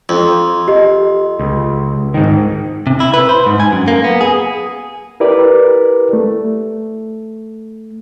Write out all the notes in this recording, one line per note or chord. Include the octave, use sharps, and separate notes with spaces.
F2
G4 D#5
C#2
G#2 D#3
C3
E4
B4
C5
G#2
G#5
F#2
A#3
B3
G#4
E4 G4 A#4 B4 D5
A3